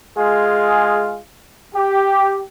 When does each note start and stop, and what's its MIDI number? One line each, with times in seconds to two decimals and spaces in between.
0.18 1.19 56
0.18 1.19 65
0.18 1.19 68
1.74 2.42 67